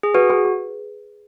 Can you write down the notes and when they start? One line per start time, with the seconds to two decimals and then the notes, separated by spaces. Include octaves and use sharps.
0.03 G#4
0.14 F#4 B4
0.30 G#4
0.45 G#4